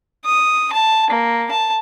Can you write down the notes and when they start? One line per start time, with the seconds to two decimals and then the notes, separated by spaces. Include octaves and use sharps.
0.25 D#6
0.73 A5
1.10 A#3
1.51 A5